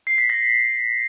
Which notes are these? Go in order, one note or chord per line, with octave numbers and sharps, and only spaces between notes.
C7
B6
A#6